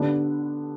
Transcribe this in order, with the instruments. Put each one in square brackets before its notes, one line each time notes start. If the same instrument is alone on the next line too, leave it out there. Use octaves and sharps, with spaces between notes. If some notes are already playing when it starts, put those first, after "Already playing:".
Already playing: [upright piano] D3 G3 B3 D4